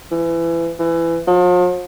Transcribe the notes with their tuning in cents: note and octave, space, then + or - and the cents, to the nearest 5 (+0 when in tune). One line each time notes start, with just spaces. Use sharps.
E3 +25
E3 +20
F3 +40